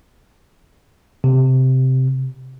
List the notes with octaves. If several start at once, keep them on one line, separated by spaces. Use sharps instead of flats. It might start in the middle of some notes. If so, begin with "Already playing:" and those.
C3